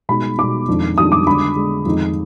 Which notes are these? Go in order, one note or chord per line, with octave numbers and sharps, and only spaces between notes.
B2 G#3 D#4 B5
B2 G#3 D#4 D6
F2 D#3 G#3 D4
F2 D#3 G#3 D4 D#6
D6
D3 G#3 D4 B5
D3 G#3 D4
F2 D#3 G#3 D#4